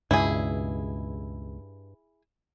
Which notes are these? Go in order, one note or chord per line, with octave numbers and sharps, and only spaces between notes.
C#2 G2 B2 E4 G#4